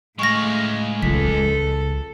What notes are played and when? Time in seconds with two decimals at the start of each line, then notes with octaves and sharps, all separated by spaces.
0.19 A2 G#3 F5 C#6 A#6
1.03 C#2 A4 B6